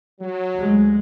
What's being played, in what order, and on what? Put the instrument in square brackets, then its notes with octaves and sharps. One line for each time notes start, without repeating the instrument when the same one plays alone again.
[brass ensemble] F#3
[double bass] D2 G#3